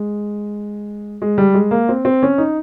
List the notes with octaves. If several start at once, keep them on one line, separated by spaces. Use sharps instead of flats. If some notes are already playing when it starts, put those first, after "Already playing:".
Already playing: G#3
G#3
G3
G#3
A#3
C4
C4
C#4
D#4